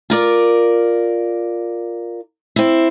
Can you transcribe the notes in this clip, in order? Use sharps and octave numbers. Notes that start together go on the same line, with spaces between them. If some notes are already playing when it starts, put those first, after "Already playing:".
F4 A#4 D5
C4 E4